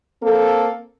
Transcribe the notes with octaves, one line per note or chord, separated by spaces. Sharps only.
A#3 C4 A4